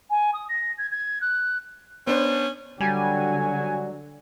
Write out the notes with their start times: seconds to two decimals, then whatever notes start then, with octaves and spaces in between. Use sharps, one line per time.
0.10 G#5
0.33 D#6
0.49 A#6
0.78 G#6
0.91 G#6
1.21 F#6
2.07 B3 C#4 D4 C5
2.80 D3 F#3 G3 F#4 G#5